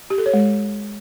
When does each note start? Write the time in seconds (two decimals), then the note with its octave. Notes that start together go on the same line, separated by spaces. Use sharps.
0.10 G4
0.18 A4
0.26 C#5
0.34 G#3